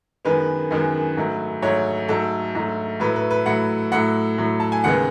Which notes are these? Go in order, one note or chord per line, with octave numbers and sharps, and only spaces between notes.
F#2 D#3 G#3 B3 B4
F#2 D#3 G#3 B3
G#2 F#3 A3
G#2 F#3 A3 C#5
G#2 F#3 A3 A4
G#2 F#3 A3
A2 F#3 A3 B4
B4
B4
A2 F#3 A3 F#5
A2 F#3 A3 F#5
A2 F#3 A3
A5
G#5
D#2 C#3 G#3 B3 F#5